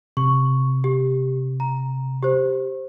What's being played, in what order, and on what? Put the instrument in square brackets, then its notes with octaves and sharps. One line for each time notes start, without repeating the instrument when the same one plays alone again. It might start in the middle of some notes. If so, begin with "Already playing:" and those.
[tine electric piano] C3 [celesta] C#6
[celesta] G4
A#5
G4 C5